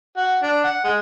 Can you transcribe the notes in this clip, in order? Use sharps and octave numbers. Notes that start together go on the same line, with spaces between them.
F#4
D4
F#5
G#3